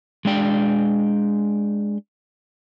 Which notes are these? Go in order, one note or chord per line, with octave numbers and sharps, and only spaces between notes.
G#3 D4 G5